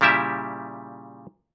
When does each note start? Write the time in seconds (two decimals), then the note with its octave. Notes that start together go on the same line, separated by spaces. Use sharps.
0.01 A#2 C#3 G3 E4 G4 E5